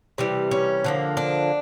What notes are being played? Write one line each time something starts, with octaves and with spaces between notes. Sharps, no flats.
C3 E3 G3
C#4
D3 F3 A#3
D4